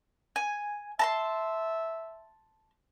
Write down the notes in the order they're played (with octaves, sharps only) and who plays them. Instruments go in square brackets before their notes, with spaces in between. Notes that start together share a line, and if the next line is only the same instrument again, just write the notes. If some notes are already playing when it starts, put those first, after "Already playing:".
[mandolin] G#5
[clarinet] E5 [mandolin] A5 A#5 C6